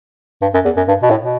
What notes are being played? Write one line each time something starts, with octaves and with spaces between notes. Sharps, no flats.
G2
F#2
E2
F#2
G2
B2
A2
B2